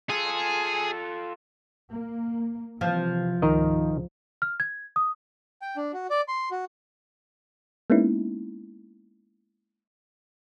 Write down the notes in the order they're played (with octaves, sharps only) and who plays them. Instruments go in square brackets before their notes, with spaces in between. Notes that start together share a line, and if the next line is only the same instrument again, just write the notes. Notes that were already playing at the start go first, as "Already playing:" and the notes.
[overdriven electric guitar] F4 A4 [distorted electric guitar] G#4
[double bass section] A#3
[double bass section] C3 E3 [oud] F3
[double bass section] C#2 G#2 [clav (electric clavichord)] D#3 A#4 D#5
[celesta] F6
G#6
D#6
[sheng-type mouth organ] G5
D4
F#4
D5
C6
F#4
[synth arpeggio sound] G#3 A#3 B3 C#4 D#4 E4